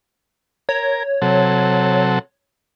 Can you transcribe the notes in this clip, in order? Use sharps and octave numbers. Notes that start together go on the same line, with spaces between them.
A#4 C#5
C3 F#3 A4